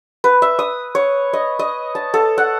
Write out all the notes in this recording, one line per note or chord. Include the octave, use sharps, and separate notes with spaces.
B4
E5
D#6
C#5
D#5
D#5
A5
A4
F#5